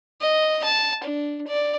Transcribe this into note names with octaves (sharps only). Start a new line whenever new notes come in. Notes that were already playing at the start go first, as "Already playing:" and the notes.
D#5
A5
D4
D5